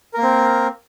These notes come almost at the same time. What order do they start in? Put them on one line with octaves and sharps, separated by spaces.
A#4 A#3 C4